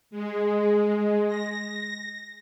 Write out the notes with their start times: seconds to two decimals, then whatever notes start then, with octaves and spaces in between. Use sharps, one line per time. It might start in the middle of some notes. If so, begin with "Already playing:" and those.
0.11 G#3
1.27 A#6